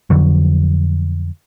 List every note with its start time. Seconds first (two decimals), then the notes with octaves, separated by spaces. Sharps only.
0.10 F2 D3 F#3